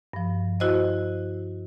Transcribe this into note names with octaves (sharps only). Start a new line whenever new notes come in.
G2 F3
E4 F#4 C5 D#5